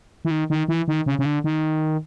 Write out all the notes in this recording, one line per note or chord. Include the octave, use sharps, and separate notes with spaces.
E3
D#3
D#3
E3
D#3
C#3
C#3
D3
D#3